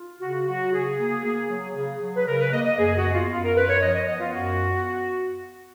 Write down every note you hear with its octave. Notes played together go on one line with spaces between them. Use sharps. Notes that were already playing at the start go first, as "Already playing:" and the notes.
Already playing: F4
C#3 F#4
F#3 F#4
C#3 G#4
A#3
A#3
F#3
C#3 G#4
F#3
B4
C#3 A#4
B4
A#3 D#5
D#5
F#2 G#4
F#4
B3
F4
F#2 F4
A#4
F#2 B4
C#5
F3 D#5
D#5
B3 D#5
F4
F#2 F#4
B3